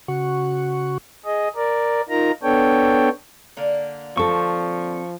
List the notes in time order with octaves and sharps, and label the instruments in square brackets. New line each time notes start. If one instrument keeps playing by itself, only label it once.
[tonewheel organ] C#3 F#4 F#5 C#6
[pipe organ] G#4 D#5
A#4 D5
D#4 F4 A#4 A#5
B3 D4 A4 C#5 G5
[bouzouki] D3 A#3
[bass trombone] F3 [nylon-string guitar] C4 A4 [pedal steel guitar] C#6